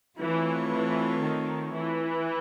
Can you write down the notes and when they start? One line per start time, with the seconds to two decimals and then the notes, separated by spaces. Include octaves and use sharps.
0.19 E3 A3 C4 F4 A4 C#5
0.71 E3
1.21 D#3
1.74 E3